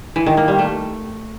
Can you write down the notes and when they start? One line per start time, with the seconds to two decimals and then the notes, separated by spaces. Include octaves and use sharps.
0.16 E3
0.26 D#3
0.37 A#3
0.48 G3
0.59 A3